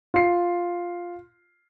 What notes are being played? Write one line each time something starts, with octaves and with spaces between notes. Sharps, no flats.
F4 C7